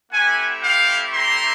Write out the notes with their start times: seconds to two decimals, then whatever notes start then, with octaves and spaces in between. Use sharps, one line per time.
0.12 A3 C4 E4 G4 F#5 G#5
0.63 F5 G5
1.14 A#5 C6